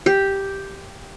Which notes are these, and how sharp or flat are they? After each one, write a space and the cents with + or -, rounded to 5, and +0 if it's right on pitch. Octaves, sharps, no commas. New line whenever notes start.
G4 +0